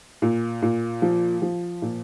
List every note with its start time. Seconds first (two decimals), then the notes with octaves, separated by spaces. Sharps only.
0.22 A#2
0.62 A#2
1.02 F3
1.42 F3
1.82 A#2